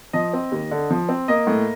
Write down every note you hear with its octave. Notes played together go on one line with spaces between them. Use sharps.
F3 D#5
C4
D#2
D3
F3
C4
A#3 D#5
A2